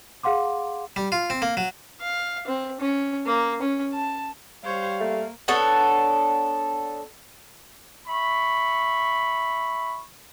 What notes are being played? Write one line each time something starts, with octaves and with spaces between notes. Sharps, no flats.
G#4 F5 F#5 C6 D6
G3
F4
C4
A#3
F#3
F5
C4
C#4
A#3
C#4
A5
G3 C5 C#5 F5
A3 A#3
B3 D4 A4 C#5
E5 B5 C#6